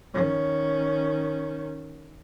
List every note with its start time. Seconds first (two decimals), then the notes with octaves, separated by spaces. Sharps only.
0.14 D#3 C#4